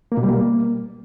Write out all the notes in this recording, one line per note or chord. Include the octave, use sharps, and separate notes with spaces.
A#3
B2
G3
A#3